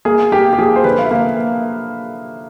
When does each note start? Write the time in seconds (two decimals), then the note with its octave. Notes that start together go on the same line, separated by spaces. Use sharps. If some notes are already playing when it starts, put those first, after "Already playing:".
0.05 A#3 G#4
0.32 A#3 G4
0.53 G4
0.58 F3 G#4
0.76 C5
0.84 D3 B4
0.99 F5
1.04 E5
1.11 A#3